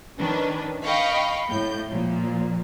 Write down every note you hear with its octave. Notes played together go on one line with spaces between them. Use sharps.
D#3 C#4 D4 B4
D#5 F5 G5 B5 C#6
A2 G6
A#2 F3